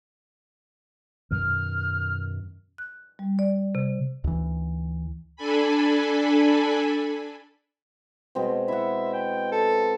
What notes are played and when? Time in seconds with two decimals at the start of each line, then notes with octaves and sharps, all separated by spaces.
1.31 F#2 B2 D#3 F6
2.78 F#6
3.19 G3
3.39 D5
3.75 C3
4.24 D2 E3
5.36 D4 A4 G#5 B5
8.35 B2 G#3 C4
8.68 E4 E5 F#5
9.14 G5
9.52 A4